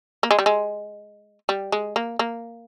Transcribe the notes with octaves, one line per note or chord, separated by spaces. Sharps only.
A#3
G#3
G3
G#3
G3
G#3
A#3
A#3